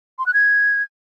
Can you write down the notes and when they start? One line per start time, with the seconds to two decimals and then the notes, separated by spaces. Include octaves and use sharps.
0.19 C6
0.26 F#6
0.34 G#6